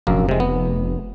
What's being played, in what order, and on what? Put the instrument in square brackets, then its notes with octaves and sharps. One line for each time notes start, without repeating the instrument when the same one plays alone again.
[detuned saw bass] F1 [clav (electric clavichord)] A#1 F#2 A#3
[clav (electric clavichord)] C3 G#3
B3